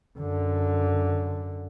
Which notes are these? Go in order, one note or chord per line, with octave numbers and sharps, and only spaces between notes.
F#2 D3